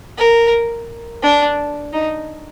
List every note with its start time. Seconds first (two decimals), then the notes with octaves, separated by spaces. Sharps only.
0.18 A#4
1.23 D4
1.93 D#4